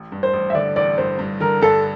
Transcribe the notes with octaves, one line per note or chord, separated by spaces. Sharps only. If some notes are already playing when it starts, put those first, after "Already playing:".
Already playing: A1
G2
C5
A1
E5
D3 D5
A1 D5
G2 C5
G2
D3 A#4
G2 A4